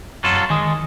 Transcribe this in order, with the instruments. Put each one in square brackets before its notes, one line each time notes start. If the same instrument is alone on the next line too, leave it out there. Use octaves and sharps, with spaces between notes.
[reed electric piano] F#2 [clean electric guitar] F#3 F4 A4
[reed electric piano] D#3 D#6 [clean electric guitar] G#3